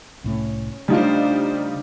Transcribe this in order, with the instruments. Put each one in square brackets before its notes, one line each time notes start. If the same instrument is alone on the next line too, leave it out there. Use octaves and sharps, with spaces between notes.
[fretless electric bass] C2 A2 A3 [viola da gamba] C#4
[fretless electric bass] C#3 A3 [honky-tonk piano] G3 D#4 F4 [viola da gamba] D4 C5